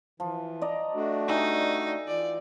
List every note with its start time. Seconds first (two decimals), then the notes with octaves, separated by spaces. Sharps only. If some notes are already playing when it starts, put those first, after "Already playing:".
0.20 E3 F3
0.61 D5 D#5 A#5
0.94 A3 D4 F#4
1.28 D#4 G4 E5 G#5
2.08 E3 F4 D5